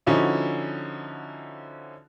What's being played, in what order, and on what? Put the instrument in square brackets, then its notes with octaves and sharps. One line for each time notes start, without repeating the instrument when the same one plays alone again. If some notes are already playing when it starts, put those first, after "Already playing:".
[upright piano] D3 F3 C#4 D#4 E4 F#4